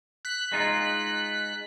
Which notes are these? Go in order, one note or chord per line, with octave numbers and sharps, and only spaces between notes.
F#6 B6
G#3 D#4 F4